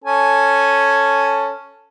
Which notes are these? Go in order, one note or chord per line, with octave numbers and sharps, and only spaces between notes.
C#4 A4 G#5